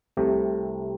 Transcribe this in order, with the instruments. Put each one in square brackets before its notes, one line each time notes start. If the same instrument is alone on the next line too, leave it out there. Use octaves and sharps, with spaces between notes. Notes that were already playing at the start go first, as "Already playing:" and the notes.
[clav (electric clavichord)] C2 C3 A3